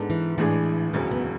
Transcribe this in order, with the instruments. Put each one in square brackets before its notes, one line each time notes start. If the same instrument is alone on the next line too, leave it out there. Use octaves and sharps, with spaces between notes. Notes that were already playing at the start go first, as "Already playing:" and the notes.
Already playing: [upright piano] G#2 G#3 B3 D4 A4
[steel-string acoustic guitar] E3
[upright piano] A1 A2 G#3 D4 G#4 [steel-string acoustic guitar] E3
[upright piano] E1 D2 C#3 F#3 [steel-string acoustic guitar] B3
[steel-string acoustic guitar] B3